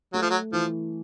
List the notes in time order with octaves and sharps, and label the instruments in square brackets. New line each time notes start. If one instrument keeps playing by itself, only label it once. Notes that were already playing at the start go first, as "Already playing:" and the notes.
[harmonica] F#3 [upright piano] A3
[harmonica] F3
F#3
[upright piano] E3 [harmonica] F3